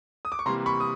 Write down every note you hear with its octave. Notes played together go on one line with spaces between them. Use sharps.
D#6
D6
C#6
C3 E3 G3 A#3 A#5 C6
B5 C#6
D#6